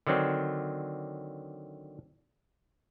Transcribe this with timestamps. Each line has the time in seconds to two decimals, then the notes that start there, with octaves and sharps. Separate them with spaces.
0.07 D3 D#3 F#3 C4 D4